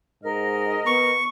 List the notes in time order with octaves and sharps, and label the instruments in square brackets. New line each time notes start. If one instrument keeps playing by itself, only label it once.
[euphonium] G#2 [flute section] A#4 D#5 F6
[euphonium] B3 [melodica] C#6